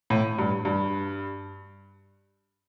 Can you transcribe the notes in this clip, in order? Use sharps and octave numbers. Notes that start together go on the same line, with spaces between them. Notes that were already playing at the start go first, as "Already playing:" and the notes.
A2
G2
G2